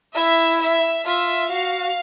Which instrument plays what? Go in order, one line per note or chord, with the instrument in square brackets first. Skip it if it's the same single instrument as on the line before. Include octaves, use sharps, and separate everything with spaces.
[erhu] E4 [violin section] E5
[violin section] E5
[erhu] F4 [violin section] E5
[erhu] F#4 [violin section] F5